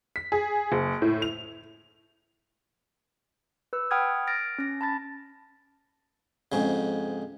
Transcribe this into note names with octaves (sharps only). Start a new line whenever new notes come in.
B6
G#4
F#1
A2
F7
B4 E6
F#5 G5 B5 D#6 F6 G#6
F6 A6 A#6 D7
C#4 A#6
A5 B5 A6
F2 G#2 C#3